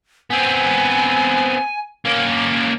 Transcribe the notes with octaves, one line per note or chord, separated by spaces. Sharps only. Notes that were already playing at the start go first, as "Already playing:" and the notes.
B3 C4 G#5
A#3 C#4